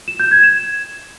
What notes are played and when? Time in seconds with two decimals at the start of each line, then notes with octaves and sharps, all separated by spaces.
0.08 E7
0.20 G6
0.31 G#6
0.43 E7